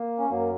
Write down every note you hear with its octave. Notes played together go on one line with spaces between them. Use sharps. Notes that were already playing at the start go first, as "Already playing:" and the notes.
Already playing: A#3
C#4
F#2 F#3 A#3